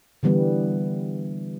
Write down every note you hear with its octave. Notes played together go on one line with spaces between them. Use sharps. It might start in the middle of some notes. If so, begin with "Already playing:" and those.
D3 E3 G3 B3